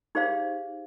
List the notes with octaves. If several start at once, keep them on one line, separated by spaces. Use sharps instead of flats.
D#4 G4 G#4 C5 D5 F5